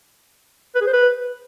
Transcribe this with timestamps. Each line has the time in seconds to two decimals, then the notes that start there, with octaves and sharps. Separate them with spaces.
0.75 B4
0.81 G#4
0.87 C5
0.93 B4